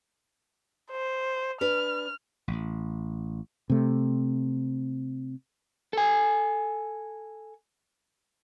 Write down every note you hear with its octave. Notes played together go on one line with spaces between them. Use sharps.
C5
D4 B4 F6
A1
C3 A3
A4 G#5